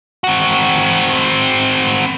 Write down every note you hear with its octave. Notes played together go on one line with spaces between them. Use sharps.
C4 F#4